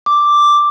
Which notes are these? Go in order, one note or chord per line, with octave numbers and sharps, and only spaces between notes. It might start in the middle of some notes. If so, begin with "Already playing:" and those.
D6